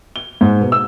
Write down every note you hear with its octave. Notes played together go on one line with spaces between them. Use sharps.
G7
G#2
B2
E6